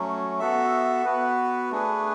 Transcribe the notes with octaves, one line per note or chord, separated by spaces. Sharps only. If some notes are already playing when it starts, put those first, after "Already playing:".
Already playing: F#3 A3 C#4
B3 F#4 A4 E5
B3 F#4 B4
A3 D4 G#4 B4